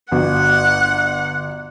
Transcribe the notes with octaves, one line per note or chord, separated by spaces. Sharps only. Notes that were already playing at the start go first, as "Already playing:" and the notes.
G1 F#4 F#5